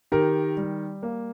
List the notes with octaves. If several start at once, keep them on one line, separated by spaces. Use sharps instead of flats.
D#3 G4 A#4
G3
A#3